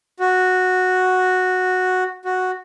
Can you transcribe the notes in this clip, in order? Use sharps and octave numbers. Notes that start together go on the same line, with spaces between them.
F#4
F#4